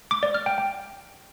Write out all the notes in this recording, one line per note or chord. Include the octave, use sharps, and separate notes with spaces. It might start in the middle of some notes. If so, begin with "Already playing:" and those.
D6
D5
F6
G5
G5